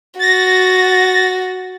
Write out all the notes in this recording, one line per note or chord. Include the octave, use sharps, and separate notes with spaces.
F#4 A6 A#6